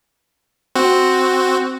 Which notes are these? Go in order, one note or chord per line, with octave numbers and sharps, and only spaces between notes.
C4 F#4